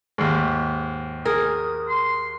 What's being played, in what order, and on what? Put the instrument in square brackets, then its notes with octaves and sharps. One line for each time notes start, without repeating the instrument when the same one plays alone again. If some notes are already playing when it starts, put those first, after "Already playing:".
[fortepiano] D#2 G#2
[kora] G#4 A#4 [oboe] D#6
[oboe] C6